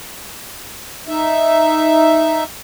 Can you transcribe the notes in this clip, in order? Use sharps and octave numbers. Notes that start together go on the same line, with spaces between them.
D#4 E5